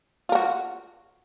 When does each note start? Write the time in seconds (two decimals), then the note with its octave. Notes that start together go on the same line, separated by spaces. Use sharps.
0.29 F4
0.32 A#4
0.35 F#4